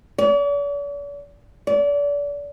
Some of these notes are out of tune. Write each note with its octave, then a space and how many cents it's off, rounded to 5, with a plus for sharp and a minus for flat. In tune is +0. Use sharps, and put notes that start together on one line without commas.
D5 -45
D5 -30